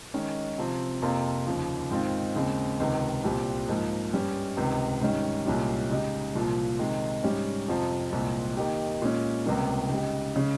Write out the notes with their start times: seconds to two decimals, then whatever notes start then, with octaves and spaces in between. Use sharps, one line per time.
0.14 D#3 G#3 C#4
0.58 C3 F3 C4
1.02 F2 C3 F3 A#3 F4
1.47 D#2 C#3 F3
1.91 G#2 D#3 G#3 C4 F4
2.35 D#2 C#3 G#3 C4
2.80 C#2 C3 D#3
3.24 C2 A#2 G3 C4 G4
3.69 G#2 F3 A#3
4.13 G2 G3 C#4
4.57 C#2 C3 D#3
5.01 G#2 D#3 G3 C#4
5.46 C2 A#2 G#3 C#4 G4
5.90 C#3 G#3 D#4 G4
6.35 C2 A#2 F3
6.79 C3 D#3 G#3
7.23 G#2 G3 C#4 G4
7.68 F2 C3 F3
8.12 C2 A#2 G#3 C4
8.57 D#3 A#3 D#4 G4
9.02 A#2 G#3 C#4
9.45 C#2 C3 G3 A#3 C#4
9.90 C#3 G#3 D#4 G4
10.35 C#3 G#3 C#4